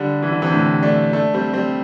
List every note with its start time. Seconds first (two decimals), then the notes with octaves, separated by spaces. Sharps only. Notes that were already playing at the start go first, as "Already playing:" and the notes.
Already playing: D3 G3
0.23 E3
0.32 D3
0.42 C3 E3
0.52 A2 D3
0.83 A3 D4
1.13 A3 D4
1.34 G3 C4
1.53 G3 C4